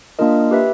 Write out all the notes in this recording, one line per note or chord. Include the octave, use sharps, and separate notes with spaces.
A#3 D4 F4 A#4 D#5
G4 B4 E5